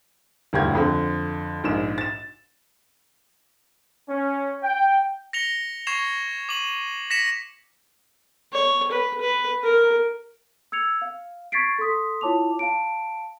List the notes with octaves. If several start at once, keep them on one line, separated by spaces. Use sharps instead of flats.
E1 D2 G2 G4 G#6
F2 D3
A#1 G#2 E7
A6 E7
C#4
G5
A#6 C#7 F7 G7
C#6 G#6 C7 E7 F7
D6 D#7 F#7
A#6 B6 C#7 E7 F7
C#5
B4
B4
A#4
E6 G#6 C#7 F7
F5
C#6 G#6 A6 B6 C7 D7
A4 C6 D#6 B6
E4 F4 C#5 A5 D6 F7
F5 A5 D7